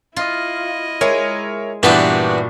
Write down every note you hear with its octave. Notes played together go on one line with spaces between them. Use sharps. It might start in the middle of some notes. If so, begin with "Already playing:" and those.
E4 F4 D#5
G#3 A#4 C#5 E5
G2 A#2 E3 B3 D4 F#4 G4 D5